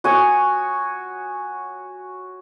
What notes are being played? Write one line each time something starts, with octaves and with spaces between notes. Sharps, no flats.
F#4 C#5 G#5 D#6